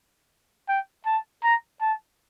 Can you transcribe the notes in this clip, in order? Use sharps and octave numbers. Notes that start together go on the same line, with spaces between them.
G5
A5
A#5
A5